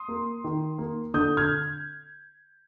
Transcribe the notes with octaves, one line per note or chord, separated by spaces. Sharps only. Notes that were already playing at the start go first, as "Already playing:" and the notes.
Already playing: C6 D#6
A#3
D#3
A#3
D3 D#6 G6
F6 G#6